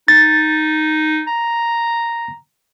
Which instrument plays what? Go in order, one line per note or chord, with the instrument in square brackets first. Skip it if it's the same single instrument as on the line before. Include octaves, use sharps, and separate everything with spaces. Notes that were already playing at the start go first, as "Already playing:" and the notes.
[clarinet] D#4 [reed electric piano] A6
[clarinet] A#5